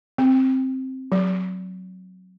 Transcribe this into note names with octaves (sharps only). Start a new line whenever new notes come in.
C4
F#3